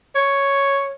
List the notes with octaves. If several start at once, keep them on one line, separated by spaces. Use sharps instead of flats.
C#5